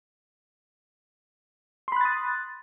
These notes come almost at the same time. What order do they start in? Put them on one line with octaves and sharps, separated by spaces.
C6 B5 F#6 A6 D#6